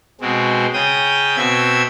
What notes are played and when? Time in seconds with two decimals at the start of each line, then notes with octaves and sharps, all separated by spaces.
0.21 B2 G#3 C4
0.73 C#3 G5 D#6
1.37 B2 C4 E5 G#6